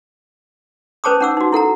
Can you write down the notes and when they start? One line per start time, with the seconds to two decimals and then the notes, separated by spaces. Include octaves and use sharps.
1.04 C#4 B4 C5 A5 D6 D#6
1.21 C#4 D#4 F#5 D6 E6
1.37 D#4 F#4
1.52 E4 A4 F#5 A#5